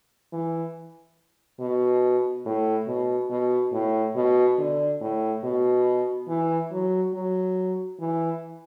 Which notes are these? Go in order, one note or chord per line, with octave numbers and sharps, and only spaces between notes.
E3
B2
A2
B2
B2
A2
B2
D3
A2
B2
E3
F#3
F#3
E3